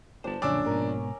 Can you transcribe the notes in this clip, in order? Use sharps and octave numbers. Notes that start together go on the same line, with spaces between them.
G1 D4 C5 A5
A#1 F#2 A#2 D3 C#4 D4 D6 E6
G#2 B2 A#4